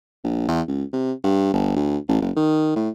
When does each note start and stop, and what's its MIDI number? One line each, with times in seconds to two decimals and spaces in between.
0.24 0.48 34
0.48 0.61 40
0.68 0.83 37
0.93 1.12 48
1.24 1.49 43
1.53 1.72 31
1.76 1.97 38
2.08 2.19 33
2.21 2.31 30
2.36 2.74 51
2.76 2.89 45